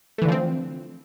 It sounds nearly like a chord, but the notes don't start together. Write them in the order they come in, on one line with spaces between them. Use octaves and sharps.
A3 E3 D3 F3 C4